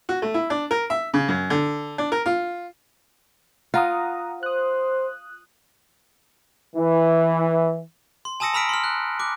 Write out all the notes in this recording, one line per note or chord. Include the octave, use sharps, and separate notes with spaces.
F#4
A3
E4
D4
A#4
E5
C#3
F#2
D3
D4
A#4
F4
F4 F#5 A#5 D#6
C5 D#6 F#6
E3
C6
G#5 A5 D#6 E6 A#6 C#7
A#5 B5 E6 F6 B6 D7
C6 F6
F#6
D6 F#6